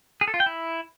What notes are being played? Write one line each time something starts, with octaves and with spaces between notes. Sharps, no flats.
G#4
A4
F4
G5
E4